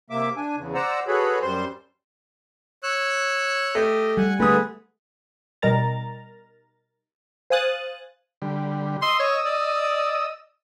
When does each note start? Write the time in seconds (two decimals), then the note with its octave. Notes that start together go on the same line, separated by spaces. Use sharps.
0.10 C3 A#3 E5 D6
0.37 D4 G#5
0.56 E2 C#3
0.74 C5 D5 F#5 A#5 E6
1.08 F#4 G#4 A4 B4 C#5 B5
1.42 F#2 G3 C5 C6
2.83 C#5 E6 F#6
3.75 A3 G4 D#5
4.17 G3 F#5 G#5
4.40 D3 A3 B3 G#4 B4 D#6
5.62 B2 G3 D#4 A#4 A#5 A6
7.50 C5 F5 G#5 D#6 F#6 A6
8.42 D3 G3
9.02 D#5 C6 D#6 E6
9.20 C#5
9.46 D5